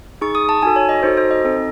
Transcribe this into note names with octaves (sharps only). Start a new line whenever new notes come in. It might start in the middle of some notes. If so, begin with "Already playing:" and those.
D#4 G#4 C#6
D#6
A5
D#4 F#4 A4 G#5
C#5
D#5
D#4 F#4 A4 C5
C5
D#5
C4 D#4 A4